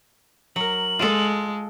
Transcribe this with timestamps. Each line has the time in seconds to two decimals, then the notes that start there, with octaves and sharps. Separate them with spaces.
0.56 F#3 A#4 F#7
0.99 G#3 F4 A4